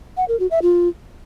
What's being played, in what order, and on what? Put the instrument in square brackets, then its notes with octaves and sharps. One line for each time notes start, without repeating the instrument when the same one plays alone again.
[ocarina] F#5
A#4
F#4
E5
F4